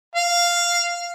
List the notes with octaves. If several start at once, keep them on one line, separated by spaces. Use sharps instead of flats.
F5